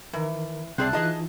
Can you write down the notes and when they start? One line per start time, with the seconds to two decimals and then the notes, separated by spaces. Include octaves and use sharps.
0.13 D#3 E3 A#4
0.78 C2 C4 G#4 D5 E5 A5 F#6
0.93 E3 D#4 F4 G#4 D#5 A5